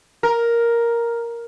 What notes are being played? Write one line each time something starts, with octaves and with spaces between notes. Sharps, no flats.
A#4